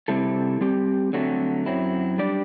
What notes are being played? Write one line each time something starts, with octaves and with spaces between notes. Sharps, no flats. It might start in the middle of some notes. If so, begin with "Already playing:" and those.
C3 G3 C4 E4 A4
G3 C4 G4
D3 F#3 A3 C4 F#4
F#2 F#3 C4 E4
G3 D4 G4 D5